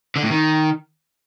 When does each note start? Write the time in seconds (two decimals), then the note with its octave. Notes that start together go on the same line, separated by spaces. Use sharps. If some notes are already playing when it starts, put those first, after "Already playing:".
0.16 D3
0.23 A2
0.30 D#3